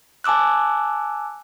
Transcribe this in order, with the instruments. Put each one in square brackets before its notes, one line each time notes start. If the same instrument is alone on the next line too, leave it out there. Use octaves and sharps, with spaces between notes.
[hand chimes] G#5 A5 D6 E6 F#6